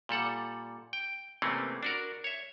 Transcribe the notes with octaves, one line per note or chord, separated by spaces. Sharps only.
A#2 G3 A4 F#5
G5
C3 E3 A3 A#3 C4 C#4
D4 F#4 A#4
C#5 E5